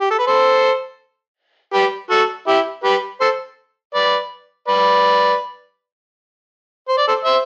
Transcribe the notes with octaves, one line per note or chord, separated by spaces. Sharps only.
G4
A4
B4
A4 C5
G4 B4
F#4 A4
E4 G4
G4 B4
A4 C5
B4 D5
B4 D5
C5
D5
A4 C5
C5 E5